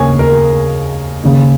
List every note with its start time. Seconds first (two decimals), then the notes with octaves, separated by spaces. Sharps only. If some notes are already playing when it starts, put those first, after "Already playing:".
Already playing: D#2 C#3 G#4 A#4 C#5
0.19 A#4
1.23 D#2 C#3